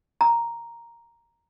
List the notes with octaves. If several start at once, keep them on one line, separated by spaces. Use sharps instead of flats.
A#5